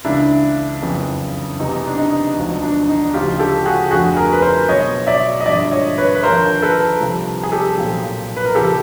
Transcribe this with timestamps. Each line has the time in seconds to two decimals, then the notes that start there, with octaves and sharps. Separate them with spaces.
0.05 C#2 C#3 E3 D4 E4
0.82 F#1 F2 C#3 E3
1.59 E2 C3 E3 D#4
1.87 D4
1.97 D#4
2.36 E1 D2 D3 F3
2.63 D4
2.88 D#4
3.14 D2 C#3 F3 F4 G4
3.39 G4 A4
3.66 F#4 G#4
3.91 F1 F2 D3 F3 F#4 G#4
4.16 G#4 A#4
4.32 B4
4.42 A#4 C5
4.69 B1 B2 C#5 D#5
5.07 D5 E5
5.40 D#5
5.46 G#1 G2 D3 F3 D5 E5
5.71 C#5 D#5
5.98 B4 C#5
6.15 B4
6.23 D#2 D3 F3 A#4 C5
6.62 A4 B4
7.01 C2 C3 F3
7.43 G#4
7.52 G4 A4
7.77 B1 A#2 F3
8.37 B4
8.45 A#4
8.55 E2 C#3 F3 G4 A4